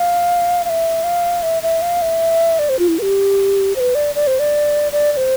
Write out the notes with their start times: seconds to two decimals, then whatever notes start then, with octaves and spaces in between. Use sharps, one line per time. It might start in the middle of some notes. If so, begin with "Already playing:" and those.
Already playing: F5
0.65 F5
0.69 E5
1.04 F5
1.43 E5
1.63 E5
1.82 F5
2.02 E5
2.59 D5
2.69 C5
2.79 F4
2.88 E4
2.99 B4
3.02 G4
3.76 C5
3.80 B4
3.95 D5
4.15 D5
4.27 C5
4.39 D5
4.92 D5
5.12 D5
5.17 C5